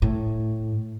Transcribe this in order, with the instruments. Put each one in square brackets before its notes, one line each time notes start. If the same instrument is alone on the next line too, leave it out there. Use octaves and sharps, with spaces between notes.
[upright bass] A2